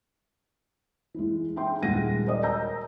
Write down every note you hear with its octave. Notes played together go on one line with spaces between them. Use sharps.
E3 G#3
G#4 E5 G5 C6
D#1 G#3 F#5 A#6 D#7
A#4 C5 D5 D#5
C#5 A#5 E6 G6 A#6